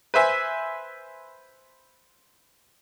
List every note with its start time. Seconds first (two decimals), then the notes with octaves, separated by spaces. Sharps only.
0.14 B4 C5 E5 G#5